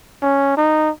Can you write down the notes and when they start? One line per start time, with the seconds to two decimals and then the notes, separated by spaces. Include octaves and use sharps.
0.22 C#4
0.57 D#4